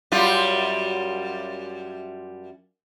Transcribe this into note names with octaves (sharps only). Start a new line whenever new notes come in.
F#2 G3 F4